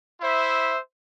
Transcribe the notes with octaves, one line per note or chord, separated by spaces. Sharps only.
E4 C5 E5